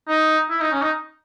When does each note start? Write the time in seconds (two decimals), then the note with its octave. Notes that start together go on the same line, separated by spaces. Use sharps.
0.08 D#4
0.50 E4
0.60 D#4
0.72 C#4
0.82 D#4